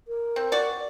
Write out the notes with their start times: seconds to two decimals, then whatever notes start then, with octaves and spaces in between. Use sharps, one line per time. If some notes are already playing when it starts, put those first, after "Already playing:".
0.07 A#4
0.36 C4
0.52 F#4 D5